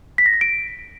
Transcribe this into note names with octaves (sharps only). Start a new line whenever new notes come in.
B6
A#6
B6
D7